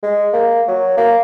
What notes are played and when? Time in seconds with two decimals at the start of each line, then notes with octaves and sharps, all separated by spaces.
0.03 G#3
0.33 A#3
0.68 F#3
0.97 A#3